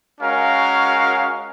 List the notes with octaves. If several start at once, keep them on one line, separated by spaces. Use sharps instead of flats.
G#3 C#4 F#4 A#4 F5